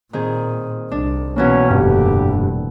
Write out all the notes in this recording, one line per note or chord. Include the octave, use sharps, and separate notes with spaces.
A#2 D#3 C4 G#4
C2 D4
B2 E3 A#3 C#4
F1 G2 D3 G4